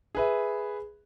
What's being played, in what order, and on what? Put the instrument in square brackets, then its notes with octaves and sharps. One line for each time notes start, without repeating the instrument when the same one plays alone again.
[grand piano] G#4 B4 E5